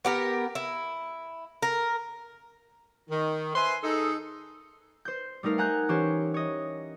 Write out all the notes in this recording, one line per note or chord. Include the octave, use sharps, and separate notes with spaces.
B3 G4 A#4
E4
A#4
D#3
B4 C5 E5 G#5 C6
D#4 G#4 A4
C5 G6
G3 A3 D#4 A#4 F5
F#5 G#5 A#5 F#6 G6
E3 C#4 G4 C5 C#5
C#5 D#5